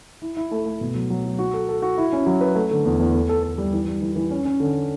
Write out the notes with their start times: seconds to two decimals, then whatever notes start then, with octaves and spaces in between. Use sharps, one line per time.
0.22 E4
0.37 E4
0.51 A3
0.66 A3
0.81 B2
0.95 F#3
1.10 F#3
1.25 F#4
1.39 F#4
1.54 A4
1.69 A4
1.82 F#4
1.98 E4
2.13 C#4
2.27 F#3
2.41 B4
2.55 A3
2.71 D3
2.85 E2
3.00 E2
3.14 A4
3.29 A4
3.43 A4
3.58 G3
3.73 E3
3.88 G3
4.02 E3
4.16 E3
4.31 C#4
4.45 C#4
4.60 D3